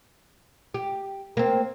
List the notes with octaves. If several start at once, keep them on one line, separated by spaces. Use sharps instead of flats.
G4
A#3 C4